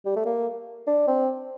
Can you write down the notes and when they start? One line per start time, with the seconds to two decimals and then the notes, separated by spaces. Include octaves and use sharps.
0.05 G3
0.16 A3
0.26 A#3
0.87 D4
1.07 C4